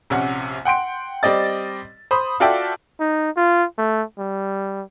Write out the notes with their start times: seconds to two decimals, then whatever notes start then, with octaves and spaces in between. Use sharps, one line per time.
0.10 A#1 C3 C#4 F#5
0.65 F#5 G5 C6 D7
1.23 G3 C4 D5 D#5 A6
2.11 C5 B5 D#6
2.40 F4 F#4 A4 D5 E5 G5
3.00 D#4
3.37 F4
3.78 A3
4.19 G3